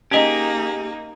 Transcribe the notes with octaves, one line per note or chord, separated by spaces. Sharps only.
A#3 C#4 D#4 G4 G#4 D#5